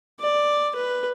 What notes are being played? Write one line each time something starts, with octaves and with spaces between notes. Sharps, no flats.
D5
B4